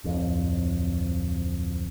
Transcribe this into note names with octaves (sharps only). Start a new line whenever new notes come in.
D1 F2